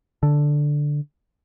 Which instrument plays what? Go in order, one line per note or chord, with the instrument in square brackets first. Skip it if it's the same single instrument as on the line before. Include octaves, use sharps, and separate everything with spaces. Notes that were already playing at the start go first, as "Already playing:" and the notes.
[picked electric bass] D3